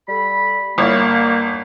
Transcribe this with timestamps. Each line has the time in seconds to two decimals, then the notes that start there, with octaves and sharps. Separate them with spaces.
0.08 G3 A4 B5
0.78 G1 A#3 E4 C#5